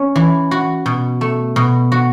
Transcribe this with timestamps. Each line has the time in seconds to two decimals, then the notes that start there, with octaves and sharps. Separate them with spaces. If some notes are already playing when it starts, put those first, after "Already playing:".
Already playing: C#4
0.16 E3
0.51 F#4
0.86 B2
1.21 A3
1.56 B2
1.92 F#4